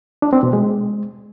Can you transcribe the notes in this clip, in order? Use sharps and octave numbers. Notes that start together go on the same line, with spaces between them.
D4
C4
B2
G#3